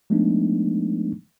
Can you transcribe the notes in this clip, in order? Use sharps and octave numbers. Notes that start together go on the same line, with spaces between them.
F3 G#3 A3 B3 D4 D#4